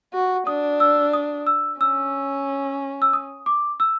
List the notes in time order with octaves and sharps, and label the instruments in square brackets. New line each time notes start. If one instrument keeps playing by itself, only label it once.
[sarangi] F#4
[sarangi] D4 [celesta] D#6
[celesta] E6
D#6
E6
[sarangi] C#4 [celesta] E6
[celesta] E6
D#6
D6
E6